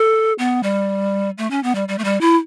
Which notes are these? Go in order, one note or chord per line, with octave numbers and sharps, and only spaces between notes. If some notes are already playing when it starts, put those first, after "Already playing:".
Already playing: A4
B3
G3
A3
C#4
B3
G3
G3
A3
G3
E4